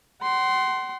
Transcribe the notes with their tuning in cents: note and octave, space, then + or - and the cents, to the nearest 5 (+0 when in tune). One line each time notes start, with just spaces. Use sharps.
F#5 +40 C6 +0